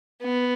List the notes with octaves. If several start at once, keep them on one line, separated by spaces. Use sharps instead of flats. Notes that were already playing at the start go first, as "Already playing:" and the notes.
B3